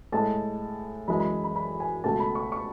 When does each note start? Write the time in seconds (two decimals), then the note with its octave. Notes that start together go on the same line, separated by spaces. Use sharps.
0.12 A2 G#3 A5
1.08 F#2 E3 G#3 B5
1.20 B5
1.44 B5
1.56 B5
1.80 G#5
2.04 C#2 B2 A3 A5
2.20 B5
2.35 C#6
2.52 C#6